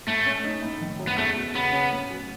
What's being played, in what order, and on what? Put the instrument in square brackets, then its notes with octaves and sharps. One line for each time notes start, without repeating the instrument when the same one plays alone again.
[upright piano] A2 [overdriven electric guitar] A3
[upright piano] C#4
D#4
A2
D#3
F#2
[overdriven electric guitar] B3
[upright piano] E2 [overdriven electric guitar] A3
[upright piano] B2
[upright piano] C#3 [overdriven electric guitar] B3
[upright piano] C#4
A2
F#3